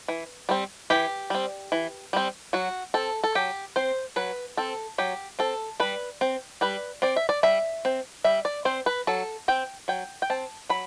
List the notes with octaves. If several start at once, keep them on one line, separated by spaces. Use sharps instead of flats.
E3
G3 C4
E3 G4
G3 C4
E3
G3 C4
F#3 F#4
C4 A4
A4
F#3 G4
C4 C5
F#3 B4
C4 A4
F#3 G4
C4 A4
G3 B4
C4
G3 B4
C4 D5
E5
D5
G3 E5
C4
G3 E5
D5
C4 C5
B4
F#3 A4
C4 G5
F#3 G5
G5
C4 A5
F#3 B5